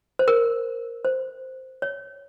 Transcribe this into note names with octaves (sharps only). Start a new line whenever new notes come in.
C5
A#4
C5
C#5